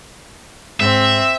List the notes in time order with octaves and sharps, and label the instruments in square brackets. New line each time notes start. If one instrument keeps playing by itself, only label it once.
[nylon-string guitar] G#2 [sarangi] C4 [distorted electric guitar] E5